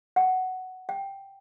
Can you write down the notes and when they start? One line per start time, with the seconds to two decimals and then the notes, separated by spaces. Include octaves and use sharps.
0.16 F#5
0.89 G5